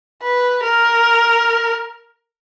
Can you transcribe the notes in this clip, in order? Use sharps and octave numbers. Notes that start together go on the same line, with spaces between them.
B4
A#4